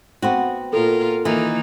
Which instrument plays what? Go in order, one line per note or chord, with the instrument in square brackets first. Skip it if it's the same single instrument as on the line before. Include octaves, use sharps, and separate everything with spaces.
[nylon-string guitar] B3 C4 F#4
[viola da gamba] A#2 F4 A#4 [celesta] A4
[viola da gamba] D#3 A#3 D#4 [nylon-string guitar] E3